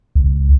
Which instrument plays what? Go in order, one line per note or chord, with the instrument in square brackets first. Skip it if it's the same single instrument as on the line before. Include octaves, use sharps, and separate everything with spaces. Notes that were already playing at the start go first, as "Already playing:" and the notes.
[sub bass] C#2